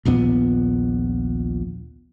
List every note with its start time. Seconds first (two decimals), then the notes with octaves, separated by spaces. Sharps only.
0.05 A#1 D#2 A#2 B3